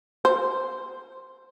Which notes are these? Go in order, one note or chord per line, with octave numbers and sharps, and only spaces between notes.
C5